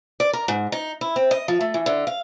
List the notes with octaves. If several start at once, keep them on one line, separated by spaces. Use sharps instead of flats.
D5
A#4
G#2
D#4
E4
C4
D#5
F3
A3
E3
D3
F5